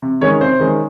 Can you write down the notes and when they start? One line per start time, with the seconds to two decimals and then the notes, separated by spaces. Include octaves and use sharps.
0.02 C3
0.21 D#3 G#3 C#4 C#5
0.41 C3 C5
0.60 D#3 G#3 C#4